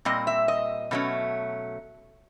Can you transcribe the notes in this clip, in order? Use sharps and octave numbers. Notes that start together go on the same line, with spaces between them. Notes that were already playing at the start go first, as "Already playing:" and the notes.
A#2 G3 C4 D#5
E5
D#5
B2 F#3 A3 C#4